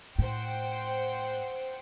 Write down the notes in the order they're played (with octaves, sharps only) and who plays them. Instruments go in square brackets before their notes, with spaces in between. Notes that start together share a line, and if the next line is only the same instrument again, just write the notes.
[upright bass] A2 [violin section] C5 F#5 G5